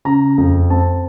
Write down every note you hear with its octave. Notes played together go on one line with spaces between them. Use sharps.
C#3 A#5
F2
C4 A5